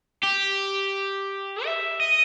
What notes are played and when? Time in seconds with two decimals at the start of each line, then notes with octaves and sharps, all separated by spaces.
0.24 G4
1.65 E5
2.00 D#5